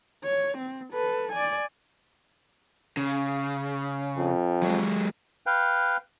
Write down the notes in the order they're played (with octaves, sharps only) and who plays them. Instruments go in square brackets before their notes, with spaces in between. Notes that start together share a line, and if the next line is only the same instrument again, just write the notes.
[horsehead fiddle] C#5
C4
A4 B4
D5 G#5
[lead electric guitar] C#3
[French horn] F2
[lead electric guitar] F#3 G#3
[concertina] B4 F5 G5